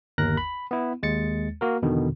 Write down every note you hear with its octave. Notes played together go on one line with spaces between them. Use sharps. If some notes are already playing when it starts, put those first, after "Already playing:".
G1 D#2 A#4 F#6 A#6
B5
B3 E4
D#2 G#3 A6 C#7
A#3 F#4 A#4
E2 B2 D3 D#3